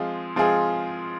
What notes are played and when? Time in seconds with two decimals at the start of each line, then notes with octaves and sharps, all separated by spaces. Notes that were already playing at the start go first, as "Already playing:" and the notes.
Already playing: F3 G#3 C4 F4 G#4
0.36 F3 G#3 C4 F4 G#4